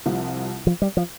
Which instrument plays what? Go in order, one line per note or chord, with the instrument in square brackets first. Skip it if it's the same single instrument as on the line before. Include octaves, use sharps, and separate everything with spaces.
[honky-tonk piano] C2 C3 F3
[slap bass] F3
G3
F3